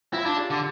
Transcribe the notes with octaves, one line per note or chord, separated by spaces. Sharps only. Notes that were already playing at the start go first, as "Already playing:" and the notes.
E4 F4
D4
G4
D3